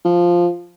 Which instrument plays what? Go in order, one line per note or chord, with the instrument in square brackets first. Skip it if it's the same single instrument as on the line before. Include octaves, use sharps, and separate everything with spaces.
[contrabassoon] F3